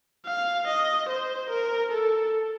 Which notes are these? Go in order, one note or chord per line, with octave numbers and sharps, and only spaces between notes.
F5
D#5
C5
A#4
A4